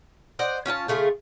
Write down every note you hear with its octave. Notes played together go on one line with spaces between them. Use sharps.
C5 D5 D#5 F#5
C#4 F4 G5 A5
C#3 A3 F4 G#4